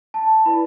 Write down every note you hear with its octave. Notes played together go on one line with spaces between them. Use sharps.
A5
E4 B4 D5 B5